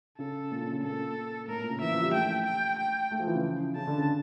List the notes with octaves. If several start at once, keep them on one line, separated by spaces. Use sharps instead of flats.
C#3 A4
A#2
C#3
C#3
A#2 A4
A2 A#4
A#2
C#3
E3 E5
F3
G3
A3 G5
G5
G5
A3
F3
E3
C#3
C#3 A5
D3
C#3